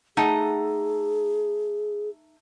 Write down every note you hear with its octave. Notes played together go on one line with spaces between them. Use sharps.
A3 D#4 G#4 F#5